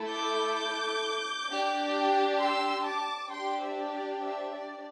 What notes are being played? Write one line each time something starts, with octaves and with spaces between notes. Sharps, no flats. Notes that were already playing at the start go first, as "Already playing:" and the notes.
Already playing: A3 E4 A4
D6 G6
D4 G4
C6 E6
A5 D6
D4 G4 G5 C6
C5 E5
D5
C5 E5
D5